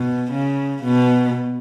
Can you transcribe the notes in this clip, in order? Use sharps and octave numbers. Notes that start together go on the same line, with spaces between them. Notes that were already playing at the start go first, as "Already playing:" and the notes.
Already playing: B2
C#3
B2